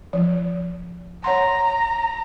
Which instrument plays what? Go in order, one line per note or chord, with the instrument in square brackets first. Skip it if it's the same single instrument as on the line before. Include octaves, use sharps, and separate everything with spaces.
[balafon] F3
[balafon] C#5 F#5 C6 [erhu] A#5